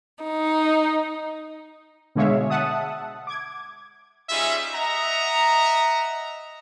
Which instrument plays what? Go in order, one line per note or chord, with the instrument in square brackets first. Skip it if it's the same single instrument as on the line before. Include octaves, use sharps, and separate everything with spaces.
[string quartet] D#4
[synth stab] B2 D3 G#3 C#5 E5 F5
E5 F#5 A5 D#6
D6 G#6
[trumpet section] G3 C#4 D#4 F4 G#4 E5
D#5 E5 F#5 A#5